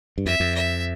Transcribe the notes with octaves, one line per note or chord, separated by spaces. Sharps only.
G2
F2 E5
F2
E5